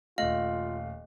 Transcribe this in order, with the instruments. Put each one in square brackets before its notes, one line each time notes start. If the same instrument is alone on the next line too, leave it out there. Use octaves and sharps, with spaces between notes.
[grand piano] D#1 A3 [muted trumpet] F4 [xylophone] D#5 [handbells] F5